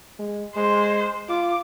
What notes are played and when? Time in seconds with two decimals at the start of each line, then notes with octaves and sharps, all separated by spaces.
0.20 G#3
0.56 G#3 C5
1.29 F4 D6